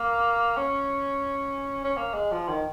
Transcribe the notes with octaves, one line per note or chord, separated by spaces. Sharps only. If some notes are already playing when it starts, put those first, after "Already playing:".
Already playing: A#3
C#4
C#4
A#3
G#3
F3
D#3